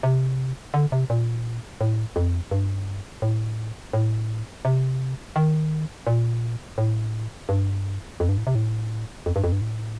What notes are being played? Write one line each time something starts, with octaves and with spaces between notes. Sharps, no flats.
C3
D3
C3
A#2
A2
F2
G2
A2
A2
C3
D#3
A#2
A2
G2
F2
G2
A2
C3
A2
F2
G2
F2
G2
A2